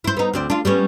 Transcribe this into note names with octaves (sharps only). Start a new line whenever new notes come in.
E4 C5
B3 D#4
D2 C4 D5
D4 F4
G3 B3 C#4